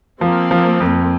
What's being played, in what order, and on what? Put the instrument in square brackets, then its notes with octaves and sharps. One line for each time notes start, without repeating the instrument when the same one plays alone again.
[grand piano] F3 [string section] A#3 C4
[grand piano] F3
F2